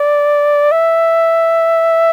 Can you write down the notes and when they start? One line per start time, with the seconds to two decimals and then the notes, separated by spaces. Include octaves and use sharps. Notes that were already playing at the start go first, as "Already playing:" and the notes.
Already playing: D5
0.72 E5